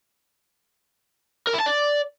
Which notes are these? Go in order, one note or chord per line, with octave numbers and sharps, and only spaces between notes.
A#4
E4
A5
D5